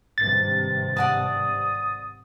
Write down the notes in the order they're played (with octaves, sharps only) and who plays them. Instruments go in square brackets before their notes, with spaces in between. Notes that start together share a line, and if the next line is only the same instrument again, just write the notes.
[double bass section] G#1 G2 C3 [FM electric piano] A6
[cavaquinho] D5 F#5 A5 [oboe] D#6